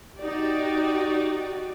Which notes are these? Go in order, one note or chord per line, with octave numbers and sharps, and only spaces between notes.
D#4 F#4 G4 D5